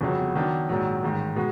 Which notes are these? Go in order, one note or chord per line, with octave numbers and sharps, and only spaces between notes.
G1 F2 C#3 F#3 B3
D#3 F#3 B3 D4
A#1 G#2 D#3 F#3
A1 G#2 D#3
B2 G#3 B3